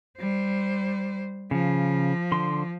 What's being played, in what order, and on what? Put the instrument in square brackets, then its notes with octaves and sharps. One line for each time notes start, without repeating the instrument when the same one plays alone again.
[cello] G3 C5
[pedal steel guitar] C#3 [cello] F3
[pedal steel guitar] D3 C6